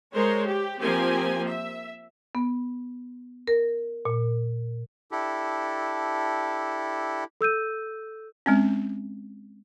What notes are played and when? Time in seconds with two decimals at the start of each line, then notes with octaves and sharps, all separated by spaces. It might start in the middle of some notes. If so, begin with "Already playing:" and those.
0.15 G#3 A#4 C5 C#5
0.48 G4
0.81 F3 A#3 C4 G4 A#4 G#5
1.47 E5
2.35 B3
3.48 A#4
4.05 A#2
5.12 D4 E4 G4 A4
7.41 A4 E6 G6 D#7
8.46 G#3 C4 C#4